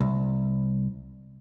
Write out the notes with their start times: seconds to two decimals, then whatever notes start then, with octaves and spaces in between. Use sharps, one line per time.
0.01 C2